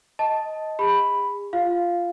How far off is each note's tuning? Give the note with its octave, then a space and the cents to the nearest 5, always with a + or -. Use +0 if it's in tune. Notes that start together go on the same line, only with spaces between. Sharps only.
D#5 +10 A5 +0
G#4 -45 B5 +0
F4 -5 F5 +0